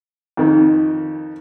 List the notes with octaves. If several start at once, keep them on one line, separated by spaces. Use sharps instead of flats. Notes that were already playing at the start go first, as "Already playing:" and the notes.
F2 D#3